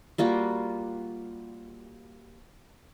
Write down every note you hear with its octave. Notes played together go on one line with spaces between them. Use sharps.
G3 A#3 F4 F#4